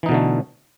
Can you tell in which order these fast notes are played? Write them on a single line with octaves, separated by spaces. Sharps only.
E3 D#4 B2 D3 A3